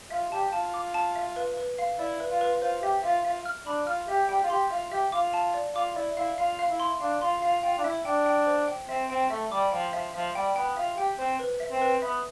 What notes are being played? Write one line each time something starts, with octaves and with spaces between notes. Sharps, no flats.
F4 E5
G4 A5
F4 A5
D6
A5
E5
B4
B4
F5
E4 D5
B4
F4
B4
F4 C5
G4 E5
F4 E5
F4 E5
F6
D4 B5
F4 F6
G4 E5
G4 G5
F4
G4 C6
F4 E5
G4 E5
F4 D6
A5
D5
F4 D6
E4 D5
E4 F5
F4 F5
F5
E4
C6
D4 F5
F4 C6
F4 F5
F4 G5
D4
E4 E5
D4 G5
G5
C5
G5
C4 E5
C4 G5
A3 E5
G3 D6
F3 G5
F3 E5
F3 E5
G3 G5
B3 G5
F4 E5
G4 G5
C4 C5
B4
E5
C4
B4
B3 E5